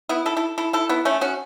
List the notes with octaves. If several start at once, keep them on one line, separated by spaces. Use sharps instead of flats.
B3 E4
E4 A4
E4 A4
E4 A4
E4 A4
B3 E4
A3 C#4
C#4 F#4